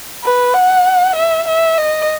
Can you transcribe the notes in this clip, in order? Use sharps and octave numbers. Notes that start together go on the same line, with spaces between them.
B4
F#5
E5
E5
D#5